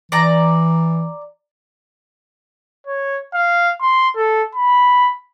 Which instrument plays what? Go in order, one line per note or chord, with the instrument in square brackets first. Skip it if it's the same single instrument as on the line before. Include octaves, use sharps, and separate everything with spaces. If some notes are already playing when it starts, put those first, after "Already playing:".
[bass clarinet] E3 [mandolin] D5 A#5
[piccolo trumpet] C#5
F5
C6
A4
B5